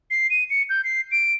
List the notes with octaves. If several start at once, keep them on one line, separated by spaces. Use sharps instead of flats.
C7
D#7
C#7
G6
C7
D7